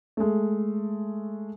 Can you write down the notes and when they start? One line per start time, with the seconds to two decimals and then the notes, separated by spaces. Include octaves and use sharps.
0.17 G#3 A3